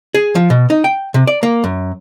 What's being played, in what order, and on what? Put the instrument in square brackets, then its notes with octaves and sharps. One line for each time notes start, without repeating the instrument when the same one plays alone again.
[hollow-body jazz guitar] G#4
F3
B2
D#4
G5
C3
D5
A#3
F#2